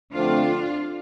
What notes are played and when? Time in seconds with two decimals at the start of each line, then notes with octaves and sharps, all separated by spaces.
0.13 F2 D3 F3 A3 C4 D4 F4